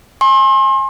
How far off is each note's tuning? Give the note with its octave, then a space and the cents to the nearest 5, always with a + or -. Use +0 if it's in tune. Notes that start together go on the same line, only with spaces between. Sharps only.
G#5 +15 C6 +35